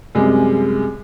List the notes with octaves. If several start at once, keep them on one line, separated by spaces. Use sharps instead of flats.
F#2 C3 G3 G#3